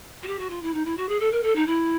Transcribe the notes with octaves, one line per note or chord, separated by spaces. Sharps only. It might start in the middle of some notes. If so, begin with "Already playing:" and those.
F#4
G4
F#4
F4
E4
D#4
E4
F#4
G#4
A4
A#4
A4
D#4
E4